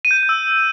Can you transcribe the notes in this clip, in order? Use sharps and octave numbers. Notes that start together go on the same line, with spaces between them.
D#7
G6
D#7
G6
E6